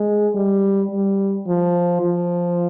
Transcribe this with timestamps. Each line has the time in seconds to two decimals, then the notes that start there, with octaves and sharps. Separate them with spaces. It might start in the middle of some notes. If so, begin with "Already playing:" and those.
Already playing: G#3
0.35 G3
0.91 G3
1.47 F3
2.02 F3